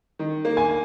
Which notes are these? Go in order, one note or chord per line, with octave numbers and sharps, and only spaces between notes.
D#3
A#3
G#5